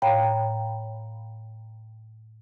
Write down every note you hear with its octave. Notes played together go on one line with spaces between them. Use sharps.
A2 C#5 F5 G5 A#5 B5